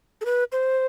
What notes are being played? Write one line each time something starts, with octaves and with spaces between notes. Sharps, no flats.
A4
B4
C5